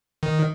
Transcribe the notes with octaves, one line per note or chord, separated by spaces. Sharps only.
D#3